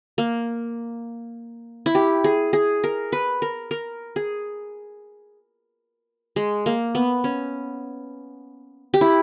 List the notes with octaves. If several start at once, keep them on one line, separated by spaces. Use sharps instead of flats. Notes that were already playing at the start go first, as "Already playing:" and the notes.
A#3
E4
G4
G#4
G#4
A#4
B4
A#4
A#4
G#4
G#3
A#3
B3
C#4
G4
E4